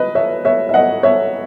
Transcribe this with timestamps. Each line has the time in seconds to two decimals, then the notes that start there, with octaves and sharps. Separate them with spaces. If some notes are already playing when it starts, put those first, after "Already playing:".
Already playing: B4 D#5
0.15 C#5 E5
0.45 C#5 E5
0.69 E5
0.74 D#5 F#5
1.03 C#5 E5